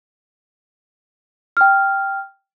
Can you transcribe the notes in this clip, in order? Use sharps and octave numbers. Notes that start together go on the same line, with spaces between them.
G5 F6